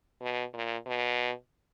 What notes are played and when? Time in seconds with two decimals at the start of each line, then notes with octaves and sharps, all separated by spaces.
0.21 B2
0.53 A#2
0.86 B2